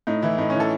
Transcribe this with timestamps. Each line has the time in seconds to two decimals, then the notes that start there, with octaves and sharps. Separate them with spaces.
0.07 A2 D#4
0.22 E3 E4
0.38 A2 D#4
0.50 C#4
0.55 E3
0.60 A4